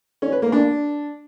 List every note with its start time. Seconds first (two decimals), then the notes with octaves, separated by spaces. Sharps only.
0.22 C#4
0.32 B4
0.42 A#3
0.52 D4